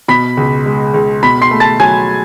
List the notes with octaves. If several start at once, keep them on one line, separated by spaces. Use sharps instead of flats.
B2 B5 B6
C#2
G#3
C#2
B2 B5 B6
C6 C7
A3
A5 A6
F#3 G#5 G#6